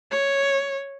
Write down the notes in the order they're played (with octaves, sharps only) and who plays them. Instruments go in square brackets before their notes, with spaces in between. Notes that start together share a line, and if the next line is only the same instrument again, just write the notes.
[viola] C#5